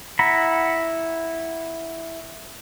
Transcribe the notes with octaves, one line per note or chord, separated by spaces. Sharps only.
E4 F#5 A#5 B5